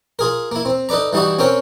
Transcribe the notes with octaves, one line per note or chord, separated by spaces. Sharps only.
F4 G#4 A#4
A#3 E4
C4
D#4 A4 B4 D5 A#5
E3 G3 D#4 E4 F#4
C4 C#4 A#4 G5